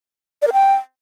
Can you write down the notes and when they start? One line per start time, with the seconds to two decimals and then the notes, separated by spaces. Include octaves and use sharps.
0.42 D5
0.47 A#4
0.53 G5